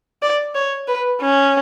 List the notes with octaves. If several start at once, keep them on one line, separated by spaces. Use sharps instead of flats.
D5
C#5
B4
C#4